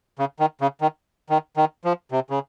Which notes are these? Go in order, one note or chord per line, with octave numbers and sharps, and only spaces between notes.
C#3
D#3
C#3
D#3
D#3
D#3
F3
C3
C#3